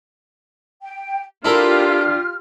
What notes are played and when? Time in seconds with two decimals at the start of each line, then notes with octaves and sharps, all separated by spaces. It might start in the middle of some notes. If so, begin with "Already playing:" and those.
0.83 G5
1.45 D4 E4 F4 G4 A4 A#4 F6